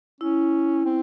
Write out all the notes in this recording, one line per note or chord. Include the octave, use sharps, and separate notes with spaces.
C#4 E4
C4